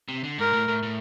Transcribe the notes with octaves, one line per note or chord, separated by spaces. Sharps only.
C3
D3
G#2 A#4
A2
A2
A2